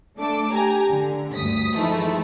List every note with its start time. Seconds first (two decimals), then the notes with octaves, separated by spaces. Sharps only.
0.17 A3 D4 A4 D6
0.53 G4 G#5 A#5
0.90 D3
1.36 D2 G2 D#6 B6
1.75 E3 F3 G#3 A3 D#4 E4